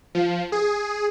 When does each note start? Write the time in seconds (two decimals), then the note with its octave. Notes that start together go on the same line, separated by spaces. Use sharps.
0.15 F3
0.52 G#4